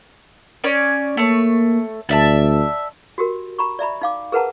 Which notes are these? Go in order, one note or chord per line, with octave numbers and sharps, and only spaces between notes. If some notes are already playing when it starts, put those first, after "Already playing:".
C#4 C#5 D5
A3 A#3 C#5
D2 D5 E5 A5
F#4 G4 A#4
A#5 B5 C#6
D5 E5 A#5 B5
D#4 F5 D6
G#4 A#4 B4 F#5 A5 A#5